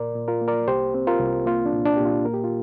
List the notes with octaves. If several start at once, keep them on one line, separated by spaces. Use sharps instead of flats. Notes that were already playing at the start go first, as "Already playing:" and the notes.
Already playing: A#2 A#4 D5
A#2
F4 A#4
A#3
A#4 D5
C2 G4 C5
C4
F4 A#4
C2
A#3 F4
D4
A#2
D4
A#2 G4
F4
A#3 A#4
G4
F4